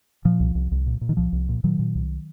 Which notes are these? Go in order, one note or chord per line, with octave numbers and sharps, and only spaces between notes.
A#2 F3
C2
C2
C2
A#2
A#2
D#3
C2 F3
C2
A#2
A#2 D#3 F#3
A#2
C2